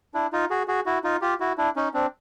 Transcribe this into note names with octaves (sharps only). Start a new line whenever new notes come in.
D4 E4
D#4 F4
F#4 G#4
F#4 G#4
E4 F#4
D#4 F4
F4 G4
E4 F#4
D4 E4
C#4 D#4
C4 D4